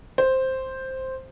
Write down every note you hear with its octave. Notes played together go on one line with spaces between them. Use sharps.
C5